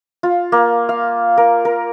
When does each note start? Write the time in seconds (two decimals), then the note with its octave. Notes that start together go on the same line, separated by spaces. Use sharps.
0.23 F4
0.52 A#3
0.89 F5
1.37 A#4
1.65 A#4